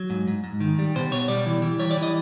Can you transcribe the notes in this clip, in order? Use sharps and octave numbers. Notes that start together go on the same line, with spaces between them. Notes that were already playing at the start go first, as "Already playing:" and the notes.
Already playing: F#3
G#2
G#2
G#2
D#3
G3
B2 C5
B2 C#5
G3 D5
E3
E3
G3 C#5
D5
E3
D#5